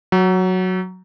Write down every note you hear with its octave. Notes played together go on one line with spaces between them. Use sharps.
F#3